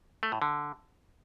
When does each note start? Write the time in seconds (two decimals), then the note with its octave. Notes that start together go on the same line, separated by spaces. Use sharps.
0.23 A3
0.32 A2
0.42 D3